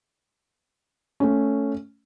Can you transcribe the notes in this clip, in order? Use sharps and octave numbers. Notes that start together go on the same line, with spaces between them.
A3 C#4